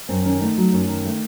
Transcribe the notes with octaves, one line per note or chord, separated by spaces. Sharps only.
F#2 C4
D#3 C#4
A3 D#4
F#3
F#2
D#3
A3